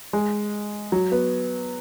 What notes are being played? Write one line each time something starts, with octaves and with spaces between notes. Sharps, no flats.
G#3
F#3
B3